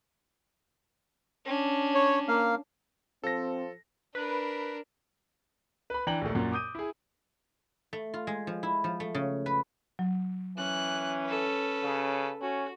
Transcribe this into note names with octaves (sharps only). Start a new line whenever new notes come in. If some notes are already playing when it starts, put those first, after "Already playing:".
C#4 D4
C#5
A#3 F5
F3 C4 A4 A#6
D4 A#4 B4
B4 B5
E3 D4 G5 A#5 F#7
A#1 D#2 A3
F#2 A#2
D6 D#6 G6 D#7
E4 G#4
A3
F4
G#3
F3
E4
F3
A3
C#3
B4
F#3
E3 C#4 F#6
A4 B4
C#3
C#4 F#4